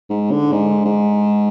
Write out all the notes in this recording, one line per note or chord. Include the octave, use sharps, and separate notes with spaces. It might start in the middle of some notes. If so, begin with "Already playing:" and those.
G#2
D3
G#2
G#2